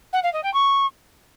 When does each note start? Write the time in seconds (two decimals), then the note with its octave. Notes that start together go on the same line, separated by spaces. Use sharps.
0.13 F#5
0.23 F5
0.33 D#5
0.44 G5
0.54 C#6